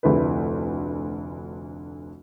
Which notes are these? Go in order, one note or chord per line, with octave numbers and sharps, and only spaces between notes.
F1 D2 E4 B4